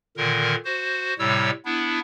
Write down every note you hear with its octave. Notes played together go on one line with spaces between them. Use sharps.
A#2 D3 D#3 A#4
F#4 C5
A2 C3 G3 C#5 E6
B3 D4 E4